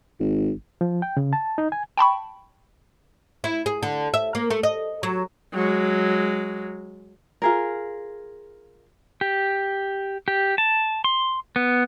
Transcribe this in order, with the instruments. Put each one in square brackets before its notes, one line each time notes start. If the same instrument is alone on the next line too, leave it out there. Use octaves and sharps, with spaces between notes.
[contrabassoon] G#1
[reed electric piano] F3
G5
C#3
A5
D#4
G#5
[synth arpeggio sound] G5 A5 B5 C#6
[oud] E4
G#4
D3
E5
A#3
A3
D#5
F#3
[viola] F#3 G#3
[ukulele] F4 G#4 A#4
[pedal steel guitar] G4
G4
A5
C6
B3